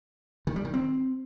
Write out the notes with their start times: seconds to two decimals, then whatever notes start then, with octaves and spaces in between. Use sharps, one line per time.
0.47 D#3
0.56 G3
0.65 D#3
0.74 C4